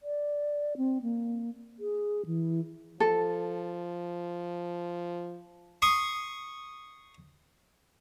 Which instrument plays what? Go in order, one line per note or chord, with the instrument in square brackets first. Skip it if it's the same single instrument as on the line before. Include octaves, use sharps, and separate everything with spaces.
[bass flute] D5
C4
A#3
G#4
E3
[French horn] F3 [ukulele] A4
[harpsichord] C6 C#6 D#6